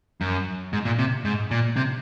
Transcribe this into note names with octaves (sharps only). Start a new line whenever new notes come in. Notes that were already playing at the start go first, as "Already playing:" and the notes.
F#2
G#2
A#2
C3
G#2
A#2
C3